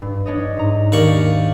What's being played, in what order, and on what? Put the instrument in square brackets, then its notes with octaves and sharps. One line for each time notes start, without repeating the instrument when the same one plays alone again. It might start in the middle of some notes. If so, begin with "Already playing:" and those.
[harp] G2
D4 C#5 D#5
G#2 A#5
[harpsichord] D#2 D5 C#6 [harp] A#4 F5